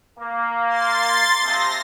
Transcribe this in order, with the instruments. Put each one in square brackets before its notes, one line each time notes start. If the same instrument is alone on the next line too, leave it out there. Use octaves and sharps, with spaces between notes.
[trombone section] A#3
[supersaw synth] C6 A6
[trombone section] C3 F3 [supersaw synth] A#6